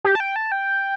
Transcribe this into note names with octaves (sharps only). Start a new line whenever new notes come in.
G4
A5
G5
A5
G5